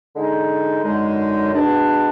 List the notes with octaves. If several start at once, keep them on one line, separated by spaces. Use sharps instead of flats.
D3 G#3 D#4
F#2 D3 G#3 D#4
B2 G#3 D4